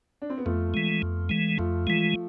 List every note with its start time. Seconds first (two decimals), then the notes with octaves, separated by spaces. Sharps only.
0.22 D4
0.30 C4
0.38 B3
0.45 F2 F3 A3
0.74 E3 G#3
1.02 F2
1.29 E3 G#3
1.58 F2 F3 A3
1.86 E3 F3 G#3